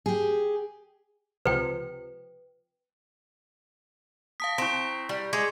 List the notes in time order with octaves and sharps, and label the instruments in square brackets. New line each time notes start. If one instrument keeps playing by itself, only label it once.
[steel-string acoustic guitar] G4 G#4
[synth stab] C#2 C3 F3 [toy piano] B4 G5
[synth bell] F5 A5 D#6 [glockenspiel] B6
[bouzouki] C4 [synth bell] E4 A#6 [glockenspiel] A#5 C#6
[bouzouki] G3
[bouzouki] G#3 [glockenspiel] D6 G#6 C#7